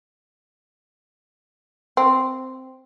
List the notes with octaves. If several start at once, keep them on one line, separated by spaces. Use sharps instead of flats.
C4